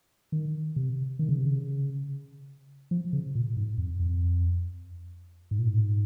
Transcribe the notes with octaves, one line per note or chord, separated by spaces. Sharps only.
D#3
C3
D#3
C#3
C3
C#3
F3
C#3
A#2
G#2
F2
F2
G#2
A#2
G#2